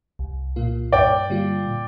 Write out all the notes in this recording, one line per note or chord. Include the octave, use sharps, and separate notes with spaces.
C2
A#2 A#3 F4
G2 D5 G5
D3 G3 A#3 F4
A#2